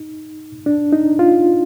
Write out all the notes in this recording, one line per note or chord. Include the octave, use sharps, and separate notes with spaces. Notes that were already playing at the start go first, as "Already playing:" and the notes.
Already playing: D#4
D4
D#4
F4